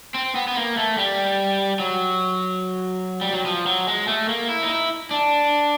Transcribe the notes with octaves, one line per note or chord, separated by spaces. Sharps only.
C4
B3
B3
A#3
A3
G3
F#3
G3
F#3
F3
F#3
G#3
A3
A#3
E4
D#4
E4
D4